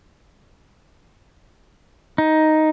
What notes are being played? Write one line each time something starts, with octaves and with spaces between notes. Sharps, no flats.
D#4